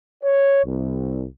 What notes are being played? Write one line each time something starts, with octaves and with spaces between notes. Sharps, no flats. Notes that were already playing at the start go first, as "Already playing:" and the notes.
C#5
C2